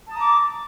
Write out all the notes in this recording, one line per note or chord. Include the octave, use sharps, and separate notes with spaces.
A5 A#5 D6 D#6